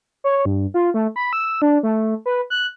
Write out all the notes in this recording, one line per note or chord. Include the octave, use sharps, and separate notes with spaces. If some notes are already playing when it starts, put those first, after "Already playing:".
C#5
G2
F4
A3
B5
E6
D4
A3
B4
F#6